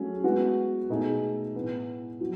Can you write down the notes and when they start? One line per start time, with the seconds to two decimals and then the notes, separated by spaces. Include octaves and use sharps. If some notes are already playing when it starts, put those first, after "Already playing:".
Already playing: F#3 A3 C#4 G#4
0.24 G#3 B3 F#4
0.89 B2 A3 D#4 G#4
1.55 A2 E3 B3
2.21 F#3